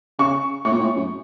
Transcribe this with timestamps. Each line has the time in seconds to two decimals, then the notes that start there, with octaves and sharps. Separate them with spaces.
0.19 C#3 C#6
0.65 A2 C#6
0.72 A#2
0.80 A2
0.96 F#2